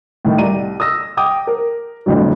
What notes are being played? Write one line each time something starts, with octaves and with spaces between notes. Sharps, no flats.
A2 D#3
C2 D5 A#5 D#7
D#6 E6 A#6
G5 D6 D#6
A#4
G1 F2 A2 D3 F#3